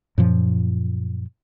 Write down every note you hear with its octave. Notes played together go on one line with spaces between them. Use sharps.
F#2 A#2 F3